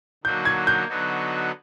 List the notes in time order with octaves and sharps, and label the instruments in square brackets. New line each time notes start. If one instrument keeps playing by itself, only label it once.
[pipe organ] D3 F#3 A#3 D#4 F#4 [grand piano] G6
[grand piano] G#6
G6
[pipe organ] D3 F#3 B3 D#4 F#4